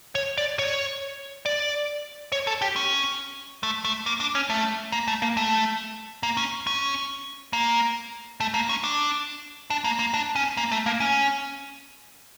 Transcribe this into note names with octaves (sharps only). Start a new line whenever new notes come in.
C#5
D5
C#5
D5
C#5
A4
G4
C#4
A3
A3
A#3
D4
C#4
A3
A#3
A3
A#3
A3
A#3
C#4
C#4
A#3
A3
A#3
C#4
D4
D4
A#3
A#3
D4
C#4
A#3
A3
A#3
C#4